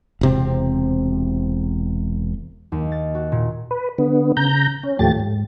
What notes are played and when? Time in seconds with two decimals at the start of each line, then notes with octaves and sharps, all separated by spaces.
0.21 E1 C3 C4
2.72 D#2
2.92 A6
3.15 F#4
3.32 A#2
3.71 B4
3.98 D3 B3
4.37 C#3 A#5 G6
4.83 C#4
4.99 D#2 A2 F3 A3 G4 A6
5.20 G#2